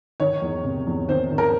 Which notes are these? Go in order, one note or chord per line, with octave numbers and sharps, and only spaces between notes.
D#3 C#5
E2
C3
E2
D#3 C5
D#3
A#4